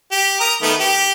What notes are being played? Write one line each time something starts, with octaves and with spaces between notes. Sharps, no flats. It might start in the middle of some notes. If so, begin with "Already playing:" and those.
G4
A#4 A#5 D#6
D#3 A3 B3
G4